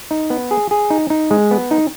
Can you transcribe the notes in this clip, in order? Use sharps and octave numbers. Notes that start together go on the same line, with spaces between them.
D#4
B3
G#4
G#4
D#4
D#4
G#3
B3
D#4